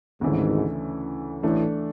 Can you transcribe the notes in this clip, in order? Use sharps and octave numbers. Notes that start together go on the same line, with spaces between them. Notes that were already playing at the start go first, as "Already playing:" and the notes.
G#1 D2 G#2 C#3 E3 A3
A1 A2 E3 A3 D4